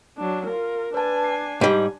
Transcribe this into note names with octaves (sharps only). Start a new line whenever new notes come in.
F#3 D4
F4 A#4
D4 B4 G#5 A5
C7
G#2 G3